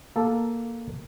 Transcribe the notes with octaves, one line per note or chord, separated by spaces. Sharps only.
A#3 A4